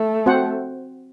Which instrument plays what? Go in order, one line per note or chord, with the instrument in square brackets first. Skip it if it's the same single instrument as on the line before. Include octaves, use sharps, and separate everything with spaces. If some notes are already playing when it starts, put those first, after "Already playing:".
Already playing: [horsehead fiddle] A3
[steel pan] C4 F#4 C5 F#5